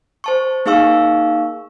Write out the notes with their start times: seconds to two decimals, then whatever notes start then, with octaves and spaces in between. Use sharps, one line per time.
0.24 C5 A5 C#6
0.66 A#3 D#4 G#4 F5 C#6 E6